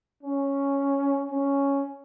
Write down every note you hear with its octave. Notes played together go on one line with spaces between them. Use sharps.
C#4
C#4